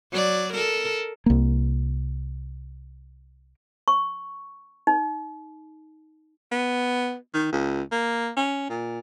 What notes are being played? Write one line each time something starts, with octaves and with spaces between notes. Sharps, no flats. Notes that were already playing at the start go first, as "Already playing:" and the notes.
F#3 D5
A4 A#4
C2 A#3
C#6
D#4
B3
D#3
C#2
A#3
C#4
A#2